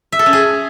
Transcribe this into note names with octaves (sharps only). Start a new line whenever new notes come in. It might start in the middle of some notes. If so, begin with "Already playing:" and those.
E5
A4
C#4
G#4